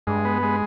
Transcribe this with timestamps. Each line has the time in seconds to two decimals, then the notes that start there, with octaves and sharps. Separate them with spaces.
0.07 G2 G#3
0.25 B3
0.42 G#3